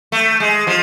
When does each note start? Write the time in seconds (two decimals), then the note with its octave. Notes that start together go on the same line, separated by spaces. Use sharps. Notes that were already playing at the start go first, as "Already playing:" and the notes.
0.12 A3
0.40 G#3
0.67 F3